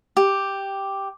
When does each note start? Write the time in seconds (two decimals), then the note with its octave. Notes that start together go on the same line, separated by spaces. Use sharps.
0.17 G4